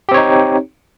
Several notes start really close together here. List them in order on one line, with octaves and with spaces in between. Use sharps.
G4 C4 C#5 D#4